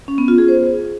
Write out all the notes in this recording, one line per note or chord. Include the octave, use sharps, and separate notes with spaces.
C#4
B3
F4
G#4
C5